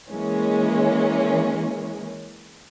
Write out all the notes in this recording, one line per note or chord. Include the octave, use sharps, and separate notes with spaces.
E3 G#3 A#3 C#4